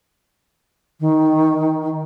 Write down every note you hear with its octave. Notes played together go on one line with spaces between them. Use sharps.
D#3